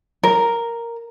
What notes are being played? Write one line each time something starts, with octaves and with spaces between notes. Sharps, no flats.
A#4